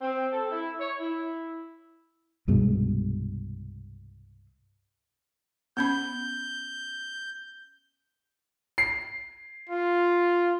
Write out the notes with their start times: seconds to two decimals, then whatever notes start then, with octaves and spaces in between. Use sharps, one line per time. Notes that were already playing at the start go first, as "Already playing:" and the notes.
0.01 C4
0.32 A4
0.50 E4
0.79 C#5
1.00 E4
2.48 C2 G2 B2 G#3
5.77 B3 C#4 B5 G6
8.78 C7
9.70 F4